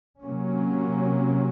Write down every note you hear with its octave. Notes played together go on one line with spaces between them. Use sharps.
C3 F#3 A#3 C#4